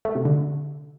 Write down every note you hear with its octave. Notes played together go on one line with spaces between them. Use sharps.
A3
C3
D3